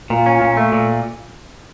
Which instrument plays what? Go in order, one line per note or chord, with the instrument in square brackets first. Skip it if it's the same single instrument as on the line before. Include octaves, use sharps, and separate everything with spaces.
[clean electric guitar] A#2 [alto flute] F4
[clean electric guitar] C#4
A#2
A3
A#2